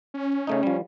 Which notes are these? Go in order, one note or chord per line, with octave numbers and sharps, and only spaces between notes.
C#4
C#3 A3 D#4
F3 G3